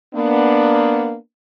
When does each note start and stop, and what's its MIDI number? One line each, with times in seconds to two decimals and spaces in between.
0.15 1.16 58
0.15 1.16 59
0.15 1.16 62